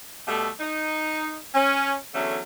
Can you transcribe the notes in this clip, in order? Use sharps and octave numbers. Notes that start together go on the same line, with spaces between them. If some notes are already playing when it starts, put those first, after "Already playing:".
B2 G3 A3
D#4
C#4
E2 D3 F#3 A3 C#4